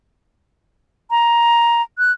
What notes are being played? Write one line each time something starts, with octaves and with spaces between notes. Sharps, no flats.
A#5
F#6